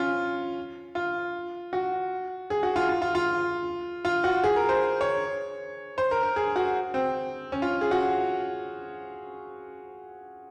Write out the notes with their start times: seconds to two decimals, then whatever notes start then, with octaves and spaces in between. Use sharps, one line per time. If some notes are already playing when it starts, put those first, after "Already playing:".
Already playing: C#4 F4
0.95 F4
1.73 F#4
2.50 G#4
2.63 F#4
2.76 F4
2.89 F4
3.02 F4
3.15 F4
4.05 F4
4.24 F#4
4.44 G#4
4.56 A#4
4.69 C5
5.01 C#5
5.98 C5
6.11 A#4
6.23 A#4
6.36 G#4
6.56 F#4
6.94 C4
7.52 C#4
7.62 F4
7.81 G#4
7.91 F#4